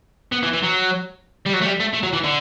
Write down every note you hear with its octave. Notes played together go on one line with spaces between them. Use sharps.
B3
E3
E3
F#3
G3
F#3
A3
G3
A3
A3
F#3
E3
D3